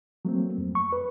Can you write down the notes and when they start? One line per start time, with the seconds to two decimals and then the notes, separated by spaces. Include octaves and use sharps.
0.25 F#3 A3 A#3 C4
0.58 F2
0.75 C#6
0.93 B4